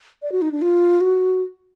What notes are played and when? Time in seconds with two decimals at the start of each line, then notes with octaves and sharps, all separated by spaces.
0.22 D5
0.32 F#4
0.42 D#4
0.52 D4
0.62 F4
1.01 F#4